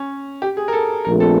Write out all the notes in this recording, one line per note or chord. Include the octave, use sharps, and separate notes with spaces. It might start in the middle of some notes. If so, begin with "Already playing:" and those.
Already playing: C#4
G4
G#4
A#4
A4
A#1 A#2 F3 A3 C4 A#4
A4